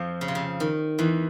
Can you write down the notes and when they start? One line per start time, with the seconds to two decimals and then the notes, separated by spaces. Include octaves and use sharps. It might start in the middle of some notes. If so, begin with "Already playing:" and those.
Already playing: F2 F3
0.21 C#3
0.28 C3
0.35 C#3
0.60 D#3
0.99 E2 E3